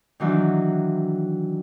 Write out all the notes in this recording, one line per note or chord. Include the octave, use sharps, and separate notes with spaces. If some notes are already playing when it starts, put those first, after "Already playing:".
D#3 E3 F#3 D4